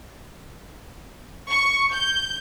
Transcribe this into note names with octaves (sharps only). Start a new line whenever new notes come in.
C#6
G6